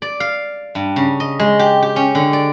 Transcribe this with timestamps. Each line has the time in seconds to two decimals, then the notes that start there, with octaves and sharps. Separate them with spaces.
0.02 D5
0.20 F5
0.75 G2
0.96 C#3
1.20 D#5
1.40 G#3
1.59 G4
1.82 G4
1.96 C#4
2.15 D3
2.33 D5